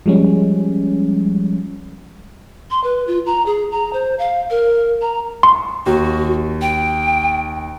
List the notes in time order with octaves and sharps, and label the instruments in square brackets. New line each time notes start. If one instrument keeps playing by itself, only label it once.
[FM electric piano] F3 G3 G#3 C#4
[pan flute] C6
B4
F4
A#5
G#4
A#5
C5
F5
A#4
A#5
[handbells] C6
[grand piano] D#2 [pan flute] F#4
[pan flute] G5